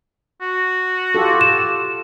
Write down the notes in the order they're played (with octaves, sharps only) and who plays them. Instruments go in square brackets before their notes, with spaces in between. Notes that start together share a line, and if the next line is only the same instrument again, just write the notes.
[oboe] F#4
[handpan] F4 G4 A4
[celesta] E7